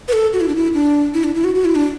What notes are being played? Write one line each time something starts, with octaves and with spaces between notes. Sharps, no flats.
B4
A4
F#4
E4
D4
E4
D4
E4
D4
E4
F#4
F#4
E4
D4